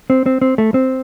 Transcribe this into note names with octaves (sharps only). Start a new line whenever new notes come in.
C4
C4
C4
A3
C4